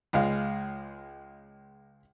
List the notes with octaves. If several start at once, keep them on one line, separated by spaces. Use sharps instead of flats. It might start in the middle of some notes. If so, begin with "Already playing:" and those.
C#2 G#3 F5